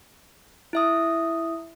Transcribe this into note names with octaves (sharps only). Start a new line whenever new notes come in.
E4 E5 D#6